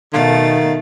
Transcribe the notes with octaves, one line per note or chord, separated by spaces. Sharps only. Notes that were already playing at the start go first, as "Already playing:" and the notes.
B2 D#3 A3 F5 A6